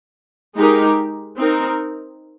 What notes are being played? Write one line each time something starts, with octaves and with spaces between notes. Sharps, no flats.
G#3 D#4 G4 A#4
C4 D#4 A#4